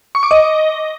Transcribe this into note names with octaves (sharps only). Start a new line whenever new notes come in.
C#6
D6
D#5